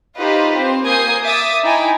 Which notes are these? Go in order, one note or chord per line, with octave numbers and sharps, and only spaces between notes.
D#4 F4 G4 B4 C5
C4 C5
A#3 G#5 D#6 G6 G#6 C7
E5 D6 D#6 A6
D#4 E4 G5 G#5